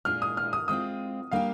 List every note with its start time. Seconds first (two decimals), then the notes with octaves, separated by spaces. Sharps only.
0.05 A#2 G#3 D4 G#4 F6
0.22 D#6
0.37 F6
0.53 D#6
0.68 G#3 C4 F4 D#6
1.31 G3 A#3 D4 G4 F5